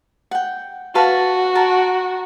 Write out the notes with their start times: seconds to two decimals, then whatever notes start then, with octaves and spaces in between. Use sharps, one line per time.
0.31 F#5 G5
0.95 F#4 B4 F5 A5
1.55 A#4 A5